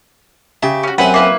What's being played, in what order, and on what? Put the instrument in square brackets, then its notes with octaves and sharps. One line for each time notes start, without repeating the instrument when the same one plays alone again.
[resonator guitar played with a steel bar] C#3 G4 [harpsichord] E5
[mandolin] C#4 F#4
[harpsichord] F#2 C4 E5 [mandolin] B4 [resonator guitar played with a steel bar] F#5 G#5
[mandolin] A#3 E4 B4